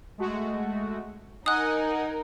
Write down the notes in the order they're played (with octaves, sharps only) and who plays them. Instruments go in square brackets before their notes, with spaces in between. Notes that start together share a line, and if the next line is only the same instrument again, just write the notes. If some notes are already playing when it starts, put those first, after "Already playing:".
[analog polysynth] G#3 A3 F#4
[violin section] D#4 A#4 [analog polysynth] D#5 F#5 G#5 [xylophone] D#6 F#6